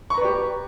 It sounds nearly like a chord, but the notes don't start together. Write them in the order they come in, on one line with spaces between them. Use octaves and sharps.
C#6 A#5 B4 D5 G4